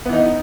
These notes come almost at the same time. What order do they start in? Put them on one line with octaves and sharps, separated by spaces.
B3 E3 D#4